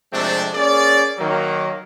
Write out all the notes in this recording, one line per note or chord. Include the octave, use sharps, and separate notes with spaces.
C3 F3 G#3 A3 C4 D4
A#3 C#4 G#4 D5
D#3 F#3 A#3